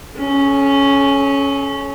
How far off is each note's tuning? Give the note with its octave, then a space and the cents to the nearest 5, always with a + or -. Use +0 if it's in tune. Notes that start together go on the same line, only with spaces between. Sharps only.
C#4 +0 A4 -45